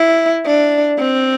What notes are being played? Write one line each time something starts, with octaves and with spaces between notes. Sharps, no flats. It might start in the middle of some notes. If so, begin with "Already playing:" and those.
Already playing: E4
D4
C4